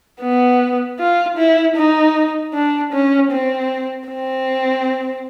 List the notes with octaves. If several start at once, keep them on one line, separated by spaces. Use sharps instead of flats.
B3
F4
E4
D#4
D4
C#4
C4
C4